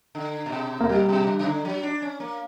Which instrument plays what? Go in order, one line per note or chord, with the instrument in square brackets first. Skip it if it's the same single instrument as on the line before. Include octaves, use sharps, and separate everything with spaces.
[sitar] D3
A#2
B2
[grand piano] A#3
[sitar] A#2 [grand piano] G3
[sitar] B2
C#3
C#3
D3
F#3
D4
C#4
A#3